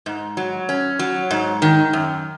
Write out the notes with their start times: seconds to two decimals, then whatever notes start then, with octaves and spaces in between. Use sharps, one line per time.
0.06 G#2
0.37 F#3
0.69 C#4
0.99 F#3
1.31 G#2
1.62 D#3
1.93 F#2